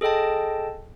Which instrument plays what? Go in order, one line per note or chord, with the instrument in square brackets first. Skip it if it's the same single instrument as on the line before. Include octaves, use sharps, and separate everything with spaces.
[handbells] G#4 A4 D#5 G5 A5